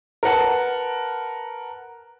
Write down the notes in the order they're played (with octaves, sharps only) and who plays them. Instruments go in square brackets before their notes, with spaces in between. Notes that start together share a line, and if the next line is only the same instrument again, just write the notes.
[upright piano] A#4 B4 F#5 A5